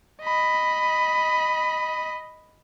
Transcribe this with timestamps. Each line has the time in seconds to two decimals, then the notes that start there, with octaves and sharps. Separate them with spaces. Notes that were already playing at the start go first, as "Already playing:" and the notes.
0.23 D#5 B5